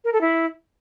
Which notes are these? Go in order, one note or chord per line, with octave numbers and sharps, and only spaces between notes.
A#4
A4
E4